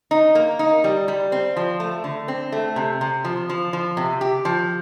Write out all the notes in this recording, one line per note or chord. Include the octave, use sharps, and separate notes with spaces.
D#4
A#3
D#4
G3
G3
C4
F3
A3
D3
C4
A3
C3
C3
F3
F3
F3
C3
G4
F3